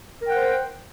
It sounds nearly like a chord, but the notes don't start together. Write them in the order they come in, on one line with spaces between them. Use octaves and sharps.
A#4 G5 F#5 C5